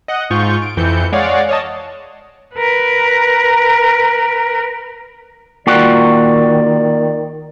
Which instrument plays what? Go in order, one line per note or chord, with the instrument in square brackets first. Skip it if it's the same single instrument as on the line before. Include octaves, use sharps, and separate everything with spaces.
[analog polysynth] D#5 F#5
G#2 F4 C#6 G6
D7
F2 E3 G6 C#7
G#3 C#5 D5 F5 F#5
C#5 D#5 A5
[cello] A#4 B4
[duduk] D#3 [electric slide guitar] A#3 F4 G5 [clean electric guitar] F#4 [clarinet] D5